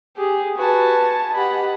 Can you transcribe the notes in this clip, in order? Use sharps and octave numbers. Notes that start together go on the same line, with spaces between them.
G4 G#4
F#4 B4 G#5 A5
G4 D#5 F#5 B5